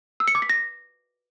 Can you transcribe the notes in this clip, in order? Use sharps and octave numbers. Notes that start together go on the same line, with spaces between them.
E6
C#7
D6
B6
A#6